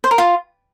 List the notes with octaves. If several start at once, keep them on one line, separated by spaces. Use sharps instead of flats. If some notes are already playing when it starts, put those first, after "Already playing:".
C5
A#4
F4